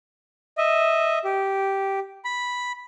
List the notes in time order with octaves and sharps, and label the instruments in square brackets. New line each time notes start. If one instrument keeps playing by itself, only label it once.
[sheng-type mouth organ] D#5 E5
G4
B5